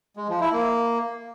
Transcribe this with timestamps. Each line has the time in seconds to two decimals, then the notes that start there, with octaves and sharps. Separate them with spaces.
0.17 G#3
0.29 F3
0.41 E4
0.53 A#3